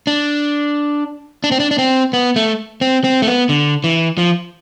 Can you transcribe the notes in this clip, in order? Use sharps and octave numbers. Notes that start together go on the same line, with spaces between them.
D4
D4
C4
D4
D4
C4
B3
A3
C4
C4
A3
B3
D3
E3
F3